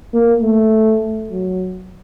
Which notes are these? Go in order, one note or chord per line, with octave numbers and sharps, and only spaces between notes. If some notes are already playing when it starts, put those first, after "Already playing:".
A#3
A3
F#3